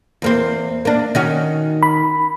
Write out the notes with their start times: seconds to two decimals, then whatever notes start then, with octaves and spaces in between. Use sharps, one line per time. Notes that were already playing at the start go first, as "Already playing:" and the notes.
0.22 E2 A#3 C4
0.85 A#3 D4
1.15 D#3 C#4 F#4
1.83 B5